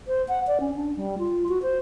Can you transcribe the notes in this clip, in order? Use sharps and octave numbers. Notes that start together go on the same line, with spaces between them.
C5
F#5
D5
C#4
D4
G3
F4
F#4
C5